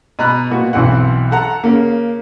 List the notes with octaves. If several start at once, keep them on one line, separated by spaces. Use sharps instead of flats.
B2 A#5 B5 F#6
A#2 B3 F#4
B1 E3 C4 F#5
A4 F#5 A#5
C#3 A#3